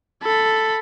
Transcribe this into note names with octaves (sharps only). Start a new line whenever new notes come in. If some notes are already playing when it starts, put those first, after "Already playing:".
A4 B5